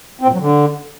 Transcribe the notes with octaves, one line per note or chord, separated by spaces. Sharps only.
C4
A#2
F#3
D3